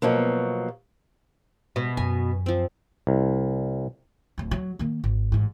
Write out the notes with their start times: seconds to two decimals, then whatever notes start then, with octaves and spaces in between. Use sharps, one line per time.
0.02 B2 F3 F#3 A#3
1.76 B2
1.97 F#2 G#5
2.46 F3 C4
3.07 C2
4.38 D1 F#3
4.51 F#3
4.79 D#3 A#3
5.04 G#1
5.32 A1 G#2